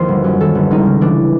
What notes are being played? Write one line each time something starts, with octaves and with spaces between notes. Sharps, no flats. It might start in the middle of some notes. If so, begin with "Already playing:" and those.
Already playing: D#2 F3 C5
G1
F#2
D#3 A4
G1
C#2 D#4
C#3
E3 D4